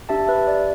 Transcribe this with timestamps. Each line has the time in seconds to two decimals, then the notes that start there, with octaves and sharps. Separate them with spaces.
0.09 D4 G4 E5 A5
0.28 B4 E5
0.47 D5